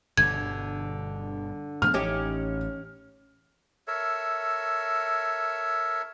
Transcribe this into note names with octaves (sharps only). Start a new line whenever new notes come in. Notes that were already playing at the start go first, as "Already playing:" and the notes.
G1 G2 B2 D3 G#6
A2 F3 B3 F6
A1 C#4 D#4 G4
A4 A#4 C#5 E5